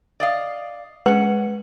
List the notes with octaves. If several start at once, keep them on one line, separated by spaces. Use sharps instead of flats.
D5 D#5 F5
G#3 C#4 B4 F#5